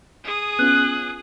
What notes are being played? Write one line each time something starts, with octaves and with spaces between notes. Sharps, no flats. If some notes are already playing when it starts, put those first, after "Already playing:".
G#4 D#6
B3 C#4 F4 F#6